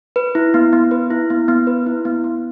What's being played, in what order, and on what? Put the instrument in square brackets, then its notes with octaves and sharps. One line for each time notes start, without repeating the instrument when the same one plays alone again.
[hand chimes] B4
E4
B3
B3
B4
E4
B3
B3
B4
E4
B3
B3